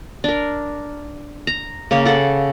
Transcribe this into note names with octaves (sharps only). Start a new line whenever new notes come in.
D4 A#4
A#5
C#3 A#3 C#5
A4 F#5